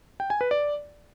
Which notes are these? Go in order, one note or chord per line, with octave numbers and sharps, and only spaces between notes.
G5
G#5
B4
D5